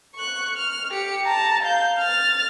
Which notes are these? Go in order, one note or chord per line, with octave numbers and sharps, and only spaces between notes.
C#6 F#6
F6
G4 C#7
A5 A#5
F5 G6
F6 A6